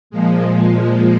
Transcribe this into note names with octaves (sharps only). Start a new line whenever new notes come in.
A#2 F3 G#3